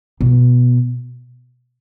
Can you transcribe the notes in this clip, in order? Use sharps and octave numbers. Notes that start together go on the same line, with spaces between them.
B2